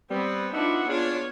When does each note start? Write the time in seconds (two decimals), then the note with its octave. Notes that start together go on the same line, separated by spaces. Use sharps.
0.11 G3 B3 C4
0.53 B3 D4 D#4 F4 F#4 E5 F#5
0.89 B3 D4 F4 G#4 C#5